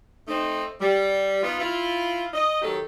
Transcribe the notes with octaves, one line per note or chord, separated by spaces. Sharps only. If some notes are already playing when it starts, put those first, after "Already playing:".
A3 C4 D#4
G3
B3 D#4 F4
E4 F4
D#5
D#3 F#3 G4 A4